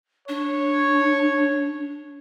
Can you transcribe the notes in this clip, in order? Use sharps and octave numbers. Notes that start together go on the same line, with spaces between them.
D4 C#5